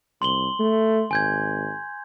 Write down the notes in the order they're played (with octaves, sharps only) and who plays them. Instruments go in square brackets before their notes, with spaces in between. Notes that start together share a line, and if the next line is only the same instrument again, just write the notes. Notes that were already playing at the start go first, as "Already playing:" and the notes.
[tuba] C2 [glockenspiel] C6 F#7 G7
[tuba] A3
[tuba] G#1 [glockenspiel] G#5 G6 G#6